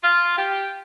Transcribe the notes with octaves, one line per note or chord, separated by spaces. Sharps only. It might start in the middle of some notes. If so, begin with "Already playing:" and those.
F4
G4